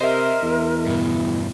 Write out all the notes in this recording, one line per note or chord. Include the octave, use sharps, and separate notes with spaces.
C3 A#4 C5 D#5 E5
E2
G2 B2